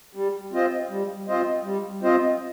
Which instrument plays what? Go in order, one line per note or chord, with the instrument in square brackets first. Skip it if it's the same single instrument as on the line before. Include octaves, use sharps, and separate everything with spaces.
[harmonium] G3
C4 F4 C5 D#5
G3
C4 F4 C5 D#5
G3
C4 F4 C5 D#5